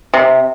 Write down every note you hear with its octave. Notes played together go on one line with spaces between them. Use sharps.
C3